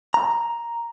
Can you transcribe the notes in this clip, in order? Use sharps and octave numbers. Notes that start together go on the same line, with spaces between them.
A#5